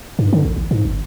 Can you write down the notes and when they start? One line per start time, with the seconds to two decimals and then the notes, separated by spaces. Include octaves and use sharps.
0.19 G2
0.33 D3
0.45 A1
0.56 A1
0.71 G#2
0.85 G1